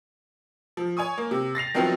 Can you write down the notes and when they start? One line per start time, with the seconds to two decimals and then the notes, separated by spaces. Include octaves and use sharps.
0.77 F3
0.97 C#5 G#5 C#6 D#6
1.18 A#3
1.31 C3
1.55 A6 A#6 C7 F7
1.74 D#3 F3 F#3 B3 C4 E4